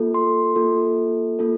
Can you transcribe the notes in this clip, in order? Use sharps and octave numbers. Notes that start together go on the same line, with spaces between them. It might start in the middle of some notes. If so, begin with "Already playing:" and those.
Already playing: A#3 F4 A4
C6
A#3 F4 A4
A#3 F4 A4